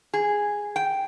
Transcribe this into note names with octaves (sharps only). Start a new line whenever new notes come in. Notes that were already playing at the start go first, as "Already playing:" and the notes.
G#4
G5